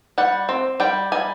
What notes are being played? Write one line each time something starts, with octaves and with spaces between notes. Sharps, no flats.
G3 F#5
C4
G3 G5
G3 G#5